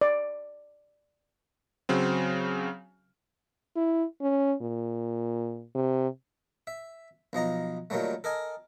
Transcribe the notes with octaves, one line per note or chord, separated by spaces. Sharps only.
D5
C#3 F#3 C4
E4
C#4
A#2
C3
E5
B1 F3 D#5 A#5
A#2 D#3 F#3 G3 A3
A4 A#4 D#5 G#5